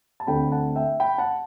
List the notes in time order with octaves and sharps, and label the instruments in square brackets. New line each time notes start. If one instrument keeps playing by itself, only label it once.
[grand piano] A5
D2 D3 A3 C4 G5 B5
F#5 A5
E5 G5
G5 B5
F#5 A5